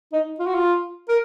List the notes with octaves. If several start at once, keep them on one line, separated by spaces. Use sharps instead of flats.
D#4
F4
F#4
F4
A#4